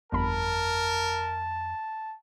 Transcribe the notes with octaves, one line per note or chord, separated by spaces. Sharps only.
G1 F2 A#4 A5 B5